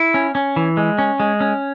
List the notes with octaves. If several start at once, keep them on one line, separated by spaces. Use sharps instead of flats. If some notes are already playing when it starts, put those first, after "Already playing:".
Already playing: E4
C#4
C#4
E3
G#3
C#4
G#3
C#4